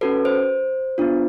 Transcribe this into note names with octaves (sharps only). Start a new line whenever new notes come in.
C#4 F#4 A4 B4
C5
B3 D4 F4